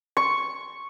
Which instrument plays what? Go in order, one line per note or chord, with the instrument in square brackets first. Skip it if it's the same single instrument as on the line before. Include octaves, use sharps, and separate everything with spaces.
[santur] C#6